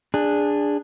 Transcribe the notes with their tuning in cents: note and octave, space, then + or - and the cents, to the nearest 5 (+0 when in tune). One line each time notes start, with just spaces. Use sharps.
D4 +0 G#4 -15